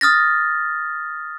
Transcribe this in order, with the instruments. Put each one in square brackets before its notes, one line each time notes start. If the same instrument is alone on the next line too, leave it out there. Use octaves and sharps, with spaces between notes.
[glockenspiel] D#6 F6 A6 A#6